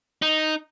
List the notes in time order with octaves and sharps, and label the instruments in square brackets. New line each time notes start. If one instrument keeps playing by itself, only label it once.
[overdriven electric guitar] D#4